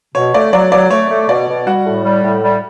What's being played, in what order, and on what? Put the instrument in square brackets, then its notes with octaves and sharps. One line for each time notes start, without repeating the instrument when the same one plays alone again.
[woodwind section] B2 [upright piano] C#5
[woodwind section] A3 [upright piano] D5
[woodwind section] F#3 [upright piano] D5
[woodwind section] F#3 [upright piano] D5
[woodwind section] A3 [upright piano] C#5
[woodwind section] A3
[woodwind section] B2 [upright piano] D5
[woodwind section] B2
[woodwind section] G3 [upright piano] F#4 F#5
[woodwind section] A2
G3
A2
G3